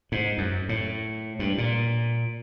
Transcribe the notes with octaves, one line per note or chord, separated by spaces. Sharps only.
G#2
F#2
A2
G2
A#2